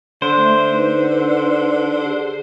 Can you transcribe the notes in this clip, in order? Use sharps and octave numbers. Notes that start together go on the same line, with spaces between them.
D3 C5
A3 E5
D#4 B4
G4 G#4